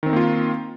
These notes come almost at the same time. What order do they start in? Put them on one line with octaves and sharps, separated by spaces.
D#3 C4 D#4 A#3 F4